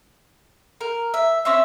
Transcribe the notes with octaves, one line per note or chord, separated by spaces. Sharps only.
A#4
E5
C4 C#4 E4 E5